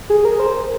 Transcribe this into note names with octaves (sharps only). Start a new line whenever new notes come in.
G#4
A#4
C5